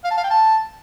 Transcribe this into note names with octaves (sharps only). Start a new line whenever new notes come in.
F5
A5
F5
G5
A5